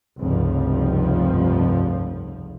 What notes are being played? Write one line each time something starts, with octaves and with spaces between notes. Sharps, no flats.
F1 C#2 G2 F3